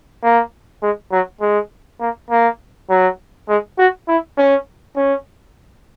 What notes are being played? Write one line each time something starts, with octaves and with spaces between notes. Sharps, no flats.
A#3
G#3
F#3
G#3
A#3
A#3
F#3
G#3
F#4
E4
C#4
C#4